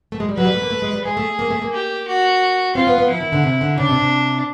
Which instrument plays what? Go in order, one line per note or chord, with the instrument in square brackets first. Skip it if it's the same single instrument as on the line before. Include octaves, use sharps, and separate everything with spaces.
[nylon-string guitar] A3
G#3
G3
[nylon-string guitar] F#3 [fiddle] B4
[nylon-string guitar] G3
A3
A#3
A3
G#3
G3
[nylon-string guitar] G#3 [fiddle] G#4
[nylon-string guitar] A3
A#3
A3
A#3
[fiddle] G4
F#4
[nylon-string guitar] C4 [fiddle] F4
[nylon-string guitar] B3
B3
[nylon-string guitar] F3 [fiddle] E4
[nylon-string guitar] D#3
D3
C3
D3
[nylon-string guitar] C#3 [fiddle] D4
[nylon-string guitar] C3
C3